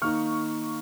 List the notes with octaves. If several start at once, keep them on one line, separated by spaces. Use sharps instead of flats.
D#3 A#3 D#4 C#6 F6